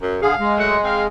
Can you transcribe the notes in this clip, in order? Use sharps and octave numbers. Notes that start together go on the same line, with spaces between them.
F#2
D3 G#4 F5
G#3
F#3 A3 F#5
C4 F5